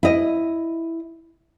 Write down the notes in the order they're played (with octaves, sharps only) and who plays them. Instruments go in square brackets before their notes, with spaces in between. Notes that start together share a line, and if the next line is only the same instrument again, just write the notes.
[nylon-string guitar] E4 D#5